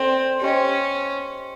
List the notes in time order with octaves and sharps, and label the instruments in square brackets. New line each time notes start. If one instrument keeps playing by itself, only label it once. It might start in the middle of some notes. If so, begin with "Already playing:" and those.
Already playing: [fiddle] C4 [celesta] A4 D5 G5 C6
[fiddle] C#4 [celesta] G4 C5 D#5 G5 C6